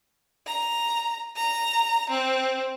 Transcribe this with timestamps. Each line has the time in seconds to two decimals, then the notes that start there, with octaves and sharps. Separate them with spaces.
0.47 A#5
1.36 A#5
2.10 C4